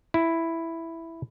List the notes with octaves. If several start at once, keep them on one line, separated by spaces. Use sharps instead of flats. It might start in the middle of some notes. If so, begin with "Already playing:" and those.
E4